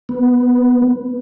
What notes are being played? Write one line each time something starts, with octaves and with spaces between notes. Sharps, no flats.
B3